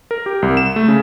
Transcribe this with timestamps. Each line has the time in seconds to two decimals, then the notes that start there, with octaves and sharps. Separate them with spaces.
0.11 A#4
0.26 G4
0.42 C2
0.57 E7
0.76 A3
0.88 C#3